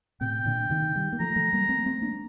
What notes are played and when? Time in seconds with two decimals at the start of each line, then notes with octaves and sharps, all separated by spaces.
0.21 A2 C3 G5
0.46 A#2 D3
0.70 C3 D#3
0.95 D#3 G3
1.13 A#3
1.20 F3 A3 A#5
1.36 F3 A3
1.53 G3 A#3
1.69 A3 C4
1.86 A3 C4
2.02 A#3 D4